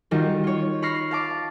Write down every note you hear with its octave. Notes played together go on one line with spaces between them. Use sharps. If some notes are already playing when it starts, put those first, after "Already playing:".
D#3 G3 F4 F#4
F4 C#5
B5 C#6 F6 A#6 C7
F5 A5 D6